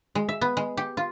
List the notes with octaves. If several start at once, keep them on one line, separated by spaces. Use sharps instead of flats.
G#3
E5
B3
G#3
G4
F4